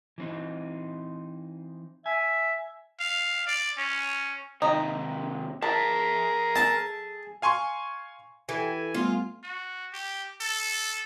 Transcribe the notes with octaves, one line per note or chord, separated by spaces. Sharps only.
E3 C4 D#4
E5 G#5
F5
D5
C#4
D#2 C3 D#4
G#4 A#4 E5 A5
A4 A5
F5 G#5 C6 C#6
E3 F#4 G4 A4 G#5
G3 A3 B3 F4
F#4
G4
A4